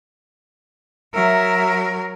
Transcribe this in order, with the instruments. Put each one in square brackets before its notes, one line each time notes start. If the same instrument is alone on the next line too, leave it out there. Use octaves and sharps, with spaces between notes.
[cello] F#3 A#4 [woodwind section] E5